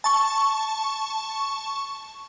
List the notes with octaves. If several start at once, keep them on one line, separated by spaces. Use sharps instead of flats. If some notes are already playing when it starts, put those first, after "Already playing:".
A5 C#6